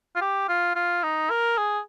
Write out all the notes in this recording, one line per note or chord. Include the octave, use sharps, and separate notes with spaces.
F4
G4
F4
F4
D#4
A#4
G#4